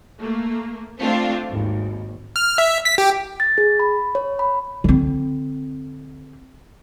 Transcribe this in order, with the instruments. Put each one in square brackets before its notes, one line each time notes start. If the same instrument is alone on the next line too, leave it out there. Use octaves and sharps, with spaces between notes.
[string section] A3 A#3
A3 C4 D4 F4
G#1 D#2
[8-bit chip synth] F6
E5
B6
G4
[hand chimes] A6
G#4
B5
C#5
B5
[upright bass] D3 C4